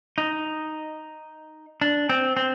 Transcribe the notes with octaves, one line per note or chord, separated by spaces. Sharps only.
D#4
D4
C4
C4